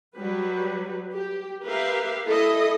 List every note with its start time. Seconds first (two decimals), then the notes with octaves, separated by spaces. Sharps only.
0.16 F#3 G3 B4
1.13 G4
1.65 G4 A#4 B4 E5 F5
2.26 E4 A4 D#5